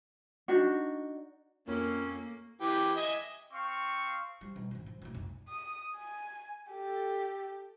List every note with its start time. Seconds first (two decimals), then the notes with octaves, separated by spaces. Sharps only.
0.48 D4 D#4 F#4
1.68 F2 A#2 A#3 C#4 A4
2.61 E3 G4
2.96 D#5 E5 G#5
3.53 C4 F5 C#6
4.41 F3 G3
4.56 B1
4.71 G#1 F3
4.86 F3
5.02 B1 A2
5.15 F1
5.49 D#6
5.96 G#5
6.71 G4 A4